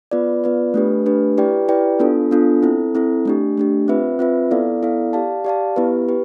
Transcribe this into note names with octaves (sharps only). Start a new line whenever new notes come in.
B3 F4 B4 D5
B3 F4 B4 D5
A3 D4 G4 B4
A3 D4 G4 B4
E4 G4 B4 D5 G5
E4 G4 B4 D5 G5
B3 D4 F4 A4
B3 D4 F4 A4
C4 E4 A4
C4 E4 A4
A3 D4 G4
A3 D4 G4
C4 F4 B4 E5
C4 F4 B4 E5
B3 E4 A4 D5 F5
B3 E4 A4 D5 F5
G4 D5 F5 A5
G4 D5 F5 A5
B3 E4 G4 B4
G4 B4